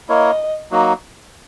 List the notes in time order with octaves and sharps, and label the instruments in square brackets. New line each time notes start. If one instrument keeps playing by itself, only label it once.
[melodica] A#3 E4 A#4 C#5 [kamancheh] D#5
[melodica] F#3 A#3 D#4 F#4